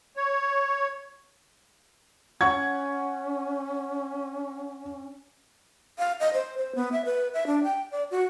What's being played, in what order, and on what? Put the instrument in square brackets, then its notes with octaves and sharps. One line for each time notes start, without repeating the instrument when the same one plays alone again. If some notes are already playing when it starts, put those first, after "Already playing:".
[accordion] C#5
[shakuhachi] C#4 [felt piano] F#5 C#6 G#6
[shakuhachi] F5
D#5
C5
C5
B3
E5
B4
E5
D4
G5
D5
F#4